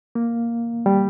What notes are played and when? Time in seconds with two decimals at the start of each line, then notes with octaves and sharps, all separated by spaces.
0.15 A#3
0.86 G3